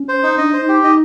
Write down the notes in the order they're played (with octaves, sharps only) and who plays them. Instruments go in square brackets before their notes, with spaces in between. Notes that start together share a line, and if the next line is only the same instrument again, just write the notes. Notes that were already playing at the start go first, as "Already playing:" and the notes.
Already playing: [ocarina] C#4
[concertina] C5
D#4
[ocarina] D4 [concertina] D#5
[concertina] C5
[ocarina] D#4
[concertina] G4
[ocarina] D#4 [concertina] D#5